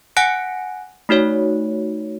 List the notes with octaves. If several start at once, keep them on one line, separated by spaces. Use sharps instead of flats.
F#5 G#5 F#6 A#6 C#7 D7
A3 D#4 F#4 C#5